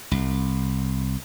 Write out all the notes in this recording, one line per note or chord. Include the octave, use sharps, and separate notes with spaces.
C2